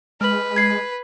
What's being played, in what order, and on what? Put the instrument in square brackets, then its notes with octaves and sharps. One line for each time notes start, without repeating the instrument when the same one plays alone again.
[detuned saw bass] G#3 [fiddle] B4 [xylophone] F6 F#7
[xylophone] G#6 C7